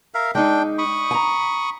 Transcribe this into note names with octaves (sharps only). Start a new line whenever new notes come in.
A#4 E5 F5
G#3 D4 D#4 G5
B5 C#6 D#6
G#5 A#5